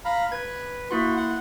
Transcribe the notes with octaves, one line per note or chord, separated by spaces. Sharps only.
F5 A#5 B5
B4 G#6
A#3 E4 F#4 C6
F#5